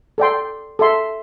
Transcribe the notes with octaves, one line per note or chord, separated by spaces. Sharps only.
A4 D5 G5 C6
A4 E5 C6